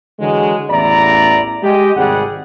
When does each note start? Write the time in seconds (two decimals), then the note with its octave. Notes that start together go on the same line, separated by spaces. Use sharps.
0.19 D3 E3 F#3 G#3
0.70 A1 E2 E4 D5 A#5
1.63 G#3 G4 D#5
1.96 G#1 C3 G3 G#4 F#5